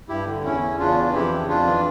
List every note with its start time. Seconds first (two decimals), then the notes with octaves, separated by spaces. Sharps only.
0.08 G2 E4 G4
0.26 D3
0.44 E2 C#4 E4
0.62 E2
0.79 C#3 D4 F4
0.97 E3
1.14 F2 E4 G4
1.31 C#3
1.49 F2 D4 F4
1.67 E3